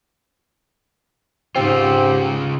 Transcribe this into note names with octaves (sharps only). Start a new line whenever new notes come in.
G#2 C#3 C4 F4 G4